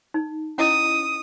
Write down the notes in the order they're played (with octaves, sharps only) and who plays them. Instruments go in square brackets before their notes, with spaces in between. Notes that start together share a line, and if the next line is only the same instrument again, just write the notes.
[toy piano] D#4
[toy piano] C#4 E4 D#5 [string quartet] D#6